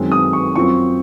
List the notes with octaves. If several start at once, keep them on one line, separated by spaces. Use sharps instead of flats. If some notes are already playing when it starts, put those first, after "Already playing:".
Already playing: F#2 D#3 G#3 C4
D#6
C#6
F#2 F3 C4 C#6